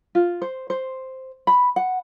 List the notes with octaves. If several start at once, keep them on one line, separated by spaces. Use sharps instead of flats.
F4
C5
C5
B5
F#5